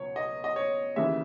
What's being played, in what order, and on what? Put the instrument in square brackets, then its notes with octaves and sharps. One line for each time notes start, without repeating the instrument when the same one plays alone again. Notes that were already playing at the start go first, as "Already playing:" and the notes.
Already playing: [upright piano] C#2 B2 F#3 C#5
D#5
D#5
C#5
D#2 C#3 E3 E5